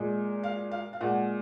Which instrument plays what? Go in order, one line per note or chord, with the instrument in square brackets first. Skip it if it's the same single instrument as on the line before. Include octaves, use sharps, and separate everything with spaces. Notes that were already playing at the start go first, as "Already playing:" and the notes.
Already playing: [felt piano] A#2 G#3
F5
F5
F5
A#2 G#3 F#5